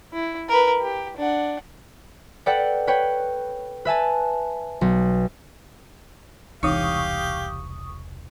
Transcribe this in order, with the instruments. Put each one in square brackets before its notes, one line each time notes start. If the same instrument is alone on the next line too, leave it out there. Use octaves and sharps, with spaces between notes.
[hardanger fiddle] E4
A#4 B4
G4
D4 F#5
[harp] A4 B4 D5 F#5 G5
B4 C#5 G5
B4 E5 G#5 A5
B1
[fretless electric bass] E1 C2 [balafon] E3 D#4 [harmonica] G4 F5 [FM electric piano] C#6 D#6